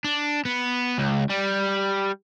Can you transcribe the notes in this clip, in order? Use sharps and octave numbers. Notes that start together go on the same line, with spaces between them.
D4
B3
C#2
G3